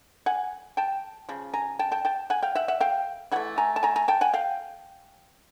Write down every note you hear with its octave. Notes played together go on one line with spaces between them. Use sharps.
F#5 G#5
G5 A5
C#3 F3
G#5 A#5
G5 A5
G5 A5
G5 A5
F#5 G#5
F5 G5
E5 F#5
E5 F#5
F5 G5
E3 A3 F#5 G#5
G#5 A#5
A5
G#5 A#5
G#5 A#5
G5 A5
F#5 G#5
F5 G5